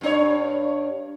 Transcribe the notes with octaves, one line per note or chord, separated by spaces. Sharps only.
G2 D4 C#5